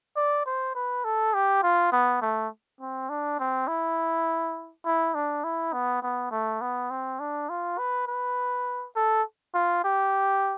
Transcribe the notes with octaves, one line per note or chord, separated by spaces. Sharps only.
D5
C5
B4
A4
G4
F4
B3
A3
C4
D4
C4
E4
E4
D4
E4
B3
B3
A3
B3
C4
D4
F4
B4
B4
A4
F4
G4